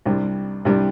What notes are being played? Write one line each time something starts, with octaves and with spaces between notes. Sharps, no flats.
C2 C3 G3 D4
C2 C3 G3 D4